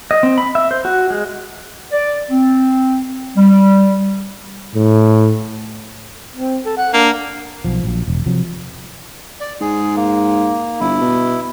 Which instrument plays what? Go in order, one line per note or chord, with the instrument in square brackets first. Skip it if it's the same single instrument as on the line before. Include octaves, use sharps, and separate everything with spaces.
[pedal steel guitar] D#5
C4
B5
E5
C5
F#4
G#3
[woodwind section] D5
C4
G3
[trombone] A2
[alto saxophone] C4
A4
F#5
[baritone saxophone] A#3 [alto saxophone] D4
[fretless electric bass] B1 F3
A#1 F#3
E1
C3 F3 F#3
[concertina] D5
[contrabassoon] G#2 [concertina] G#4
[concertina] A#3
[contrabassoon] G1 [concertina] E4
[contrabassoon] B2